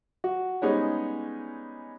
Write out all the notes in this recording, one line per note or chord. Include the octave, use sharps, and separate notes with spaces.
F#4
G3 G#3 B3 C#4 D#4 G#4